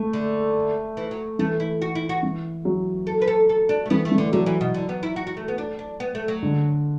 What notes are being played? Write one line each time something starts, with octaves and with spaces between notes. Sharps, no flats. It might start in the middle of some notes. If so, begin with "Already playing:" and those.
Already playing: A3
D3
E3
F#3
E3 A3
E4
F#4
E4
F#4
E3
F#3
A4
B4
A4
A4
D4
A3
E3 B3
A3
E3
D3
D3 F#3
E3
B2
D3
B3
E4
F#4
F#4
A3
B3
D4
D4
B3
A3
F#3
D3